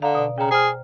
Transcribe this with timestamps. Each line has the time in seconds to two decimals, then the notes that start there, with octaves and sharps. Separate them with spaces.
0.02 D3 F5 A#5
0.15 B2 D5
0.38 C#3 G5 A#5
0.51 G#4 C5 F6